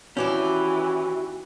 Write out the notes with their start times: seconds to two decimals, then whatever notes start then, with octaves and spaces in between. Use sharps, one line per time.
0.17 D#2 E3 C#4 E4 F#4 D5 G5